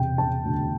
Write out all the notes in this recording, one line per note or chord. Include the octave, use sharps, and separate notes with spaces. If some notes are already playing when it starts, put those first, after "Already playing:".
Already playing: E1 C3 G5
E1 A5
D2